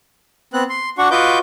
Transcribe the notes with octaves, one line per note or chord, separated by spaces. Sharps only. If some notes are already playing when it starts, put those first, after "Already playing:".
B3 C4 F#6
C6
D4 F#4 F#5 C#6
F4 F#4 B4 D#5 D6 G6